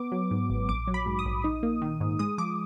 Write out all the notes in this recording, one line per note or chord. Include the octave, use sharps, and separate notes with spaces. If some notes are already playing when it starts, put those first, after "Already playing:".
Already playing: B3 D6
F#3
G#2
G#1
A#1 D6
F#3
B5
G#2
D#6
A#1
D#4
A#3
D#3
G#2
G#3 D#6
F3 D6